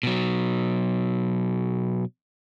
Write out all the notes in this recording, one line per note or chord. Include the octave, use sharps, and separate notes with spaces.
B2 F#3